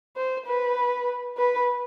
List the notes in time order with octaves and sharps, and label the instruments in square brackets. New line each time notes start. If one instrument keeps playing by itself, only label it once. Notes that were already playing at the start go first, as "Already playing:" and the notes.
[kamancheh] C5
B4
B4